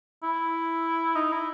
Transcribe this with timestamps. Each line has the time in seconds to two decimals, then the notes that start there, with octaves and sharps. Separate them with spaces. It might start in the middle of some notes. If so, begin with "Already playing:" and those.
0.23 E4
1.15 D#4
1.32 E4